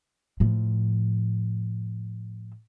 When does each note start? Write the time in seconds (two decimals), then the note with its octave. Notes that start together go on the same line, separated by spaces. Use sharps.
0.40 A2 F3